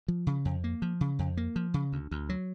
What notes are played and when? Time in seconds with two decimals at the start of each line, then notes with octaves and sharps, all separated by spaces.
0.08 F3
0.27 C#3
0.45 F2
0.64 A#3
0.82 F3
1.01 C#3
1.19 F2
1.37 A#3
1.56 F3
1.74 C#3
1.92 D2
2.11 D2
2.29 F#3